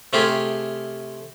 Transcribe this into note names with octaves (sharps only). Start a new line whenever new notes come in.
C3 A3 F4 G4 G#4